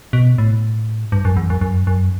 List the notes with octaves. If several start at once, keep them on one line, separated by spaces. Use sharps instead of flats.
B2
A2
G2
F#2
E2
F#2
F#2
F#2